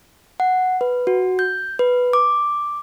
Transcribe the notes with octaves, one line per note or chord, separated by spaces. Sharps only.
F#5
B4
F#4
G6
B4
D6